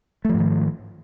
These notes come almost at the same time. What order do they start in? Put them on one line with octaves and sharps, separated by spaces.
A3 F3 G#2 D#3